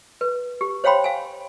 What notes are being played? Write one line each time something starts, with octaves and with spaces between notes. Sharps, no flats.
B4
G4
C5 C#5 F5 G5 B5 C6
F5 G#5